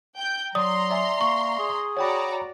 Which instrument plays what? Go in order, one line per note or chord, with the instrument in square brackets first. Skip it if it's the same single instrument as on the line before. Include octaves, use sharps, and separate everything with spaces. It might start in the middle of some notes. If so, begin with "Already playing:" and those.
[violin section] G5 G6
[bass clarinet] F#3 [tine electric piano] D5 [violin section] A#5 C6 [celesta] D#6
[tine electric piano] D5 E5 G#5
[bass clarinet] A#3 [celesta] C#6
[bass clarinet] G#4
[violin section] F#4 D5 A#5 [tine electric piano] C#5 G5 B5